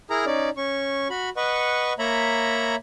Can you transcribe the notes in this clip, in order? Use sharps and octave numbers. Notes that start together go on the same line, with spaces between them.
E4 G#4 A#4 A#5
C#4 D#4 D5
C#4 C#6
F#4 B5
B4 D#5 F#5 C#6
A#3 C#5 E5 A#5 B5